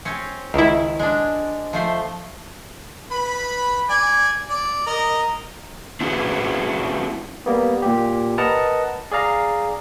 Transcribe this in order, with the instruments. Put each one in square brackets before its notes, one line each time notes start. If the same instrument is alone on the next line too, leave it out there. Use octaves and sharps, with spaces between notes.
[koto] C4 C#4
[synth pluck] C#2 E4 [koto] D#3
[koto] G#3 D4
F3 A3 C5
[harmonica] B4 B5
D5 G#5
D5
A#4 D#5
[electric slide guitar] C4 C#4 E4 F#4 G#4 B4
[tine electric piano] G3 A#3 B3
A#2 G4
A#4 B4 D#5 F#5 A5 A#5
G#4 D5 F5 A#5